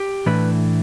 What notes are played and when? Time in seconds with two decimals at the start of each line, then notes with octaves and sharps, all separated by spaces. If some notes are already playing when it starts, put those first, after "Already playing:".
Already playing: G4
0.26 A2 E3 A3 D4 B4